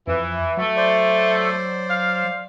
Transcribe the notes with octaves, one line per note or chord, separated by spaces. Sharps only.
F2 E3
F#3 A3
C5 D5
F5